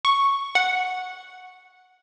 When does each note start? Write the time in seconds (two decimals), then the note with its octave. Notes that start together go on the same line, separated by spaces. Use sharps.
0.05 C#6
0.55 F#5